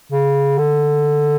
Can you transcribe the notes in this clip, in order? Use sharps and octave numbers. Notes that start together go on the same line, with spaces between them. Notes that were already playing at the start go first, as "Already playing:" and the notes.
C#3
D3